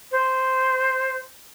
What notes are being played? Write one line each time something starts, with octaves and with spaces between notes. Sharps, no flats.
C5